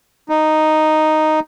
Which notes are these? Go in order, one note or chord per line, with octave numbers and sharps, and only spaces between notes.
D#4